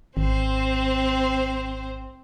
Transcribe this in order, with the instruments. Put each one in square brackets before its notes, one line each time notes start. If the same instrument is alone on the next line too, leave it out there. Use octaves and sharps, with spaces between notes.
[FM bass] G#1 [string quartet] C4 C5